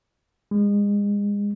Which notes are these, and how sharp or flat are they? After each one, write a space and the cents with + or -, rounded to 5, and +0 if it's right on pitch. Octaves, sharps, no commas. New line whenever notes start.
G#3 -30